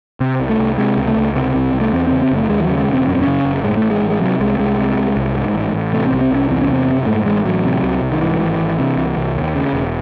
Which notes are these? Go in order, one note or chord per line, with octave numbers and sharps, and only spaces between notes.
C3 C4
C2
A3
C2
C3 G#3
C#2
A3
C#2
C3 C4
C2
C2
A3
E2 C4
C#3 C4
C4
F#1 A3
D#2 G#3
E3
F#3
C#3
G#3
E1
C4
F#2 C#4
C4
C#3 C#4
F#1
A2 G#3
A3
A1
G#3
A1
G#3
C3 F#3
C2 G#3
C2 G#3
C3
C2
C2
G#2
A1
A1
C3 A3
C4
C2
C4
C2 C#4
E2 C4
C#4
C3
C4
F#1
G#2 A3
A1 G#3
A1 F#3
C3
C2
C2
D#3
G#2 E3
G#1
G#1
C3
C2
C2
D#2
C#3
E1